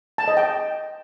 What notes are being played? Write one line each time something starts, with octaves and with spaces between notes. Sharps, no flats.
A5
D#5
G5